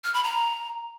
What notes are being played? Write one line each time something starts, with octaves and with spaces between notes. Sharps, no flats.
F6
B5
A#5